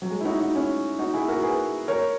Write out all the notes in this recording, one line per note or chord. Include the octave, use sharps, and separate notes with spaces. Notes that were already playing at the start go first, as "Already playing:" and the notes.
F#3
G#3
E4
D#4 F#4
D#4 F#4
C#4 E4
D#4 F#4
E4 G#4
F#4 A#4
G#4 B4
A#4 C#5